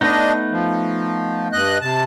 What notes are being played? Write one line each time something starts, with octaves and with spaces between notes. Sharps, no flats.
A3 B3 D4 D#4 D#5
F3
G2 D#5 F#6
C3 A5